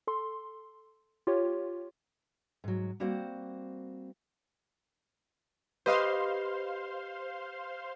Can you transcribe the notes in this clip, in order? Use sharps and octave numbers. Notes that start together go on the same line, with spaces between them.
A4 C6
F4 G4 C#5
G#2 F#3
G3 A#3 C4 F#4 C5
G4 B4 C5 D#5 F5 C6